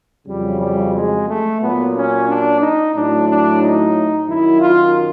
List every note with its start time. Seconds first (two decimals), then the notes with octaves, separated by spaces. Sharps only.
0.26 F2 C#3 F#3 G3
0.60 G3
0.93 G#3
1.27 A3
1.60 A#2 F#3 B3
1.93 C#4
2.27 D4
2.61 D#4
2.94 A2 F#3 D4
3.27 D4
3.61 D#4
4.27 F#2 D#3 F#3 E4
4.61 F4